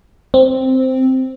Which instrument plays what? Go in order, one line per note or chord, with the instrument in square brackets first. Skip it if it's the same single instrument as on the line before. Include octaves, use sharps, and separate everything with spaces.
[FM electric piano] C4